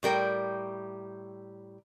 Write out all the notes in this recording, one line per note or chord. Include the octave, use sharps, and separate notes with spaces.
A2 G3 A#4 G5